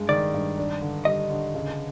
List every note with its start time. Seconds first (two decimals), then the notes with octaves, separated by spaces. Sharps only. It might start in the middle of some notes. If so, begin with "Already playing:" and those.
Already playing: G2 G#3
0.09 D#3 D5
0.34 G2
0.58 D4
0.81 D3
1.05 G3 D#5
1.30 D3
1.55 C#3